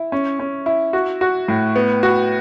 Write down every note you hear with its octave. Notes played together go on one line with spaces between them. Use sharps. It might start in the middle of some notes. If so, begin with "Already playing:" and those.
Already playing: E4
C#4
C#4
E4
F#4
F#4
A2
B3
F#4